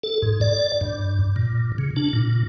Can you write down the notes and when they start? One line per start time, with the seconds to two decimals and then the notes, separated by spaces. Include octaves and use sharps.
0.03 A4
0.22 G#2
0.41 D5
0.81 G2
1.36 A#2
1.78 C#3
1.96 D4
2.13 A#2